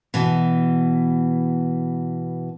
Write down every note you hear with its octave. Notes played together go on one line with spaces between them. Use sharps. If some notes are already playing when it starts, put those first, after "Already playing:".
B2 E3